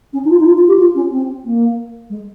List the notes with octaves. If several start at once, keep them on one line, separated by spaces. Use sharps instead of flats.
C#4
D#4
F4
D#4
F4
F4
G4
F4
C#4
C4
A#3
G#3